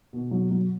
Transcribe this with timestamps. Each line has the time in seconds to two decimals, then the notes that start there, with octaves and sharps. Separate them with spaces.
0.13 B2
0.31 F#3
0.51 F#3